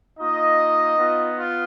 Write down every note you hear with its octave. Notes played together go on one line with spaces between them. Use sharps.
A#3 D#4 F4 D#5
B3 F4
F4